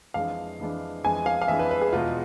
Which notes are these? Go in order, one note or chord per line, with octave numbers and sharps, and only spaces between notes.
F2 E3 G#3 D4 F5
F2 E3 G#3 D4
F2 E3 G#3 D4 G#5
F5
F5
F2 E3 G#3 D4 E5
B4
B4
G#4
E2 B2 G#3 F4